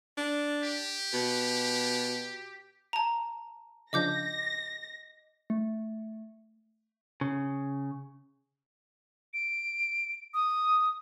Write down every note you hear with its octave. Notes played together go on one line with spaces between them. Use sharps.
D4
G4
B2
A5 A#5
C#3 F3 D4 D#5 D6 G6 A#6
A3
C#3
D7
D#6